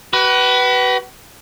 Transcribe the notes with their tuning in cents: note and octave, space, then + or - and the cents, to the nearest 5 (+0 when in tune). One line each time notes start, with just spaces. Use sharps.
F#4 +45 B4 +0